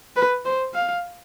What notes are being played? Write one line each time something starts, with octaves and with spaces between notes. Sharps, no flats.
B4
C5
F5